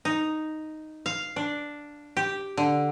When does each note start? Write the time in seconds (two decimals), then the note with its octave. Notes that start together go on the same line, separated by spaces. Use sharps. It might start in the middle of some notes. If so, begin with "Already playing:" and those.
0.05 D#4
1.06 F5
1.36 D4
2.17 G4
2.57 D3